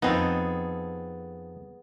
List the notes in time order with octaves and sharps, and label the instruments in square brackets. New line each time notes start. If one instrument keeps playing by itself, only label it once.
[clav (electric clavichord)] F2 C4 D#4 [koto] B3 G#4 A4